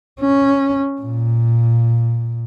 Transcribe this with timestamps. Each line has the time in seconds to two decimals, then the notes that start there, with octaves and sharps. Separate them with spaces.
0.20 C#4
1.01 A#2